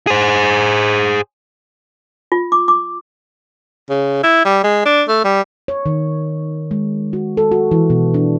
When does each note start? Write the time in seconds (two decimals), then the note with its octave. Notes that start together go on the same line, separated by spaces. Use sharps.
0.07 G#4 C5
2.32 F4
2.52 D6
2.68 D6
3.90 C#3
4.23 E4
4.45 G3
4.64 G#3
4.86 D4
5.08 A3
5.24 G3
5.68 C#5
5.86 D#3
6.71 G#3
7.13 F#4
7.37 A4
7.52 F#4
7.71 E3
7.90 B2
8.14 D4